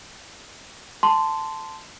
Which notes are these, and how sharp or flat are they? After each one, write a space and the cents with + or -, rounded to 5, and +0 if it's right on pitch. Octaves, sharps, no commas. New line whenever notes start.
A5 +0 C6 -15